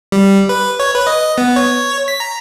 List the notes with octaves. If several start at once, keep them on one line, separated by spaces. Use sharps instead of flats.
G3
B4
C#5
B4
D#5
B3
C#5
B6
A#5